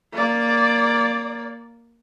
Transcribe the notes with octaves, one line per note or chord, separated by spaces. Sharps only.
A#3 D5